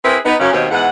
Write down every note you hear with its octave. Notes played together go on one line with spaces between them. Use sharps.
C4 E4 G#4 A#4 B4
B3 D#4
F#2 C#3 C#4
D#2 B2 D#3 C4 C#5
E2 G#2 F#5